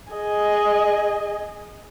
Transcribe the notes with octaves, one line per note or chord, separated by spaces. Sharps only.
G#4 D#5